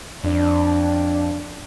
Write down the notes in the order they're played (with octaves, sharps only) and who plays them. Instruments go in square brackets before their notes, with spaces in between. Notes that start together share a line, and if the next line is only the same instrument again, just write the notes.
[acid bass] F2 [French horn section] D4